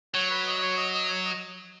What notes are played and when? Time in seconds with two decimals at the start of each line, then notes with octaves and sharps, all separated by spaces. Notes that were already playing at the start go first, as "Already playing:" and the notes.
0.14 F#3 C#5
0.31 B4
0.47 D#5
0.58 D#5
0.62 C#5
0.77 D#5
0.94 D#5
1.09 C#5
1.25 D#5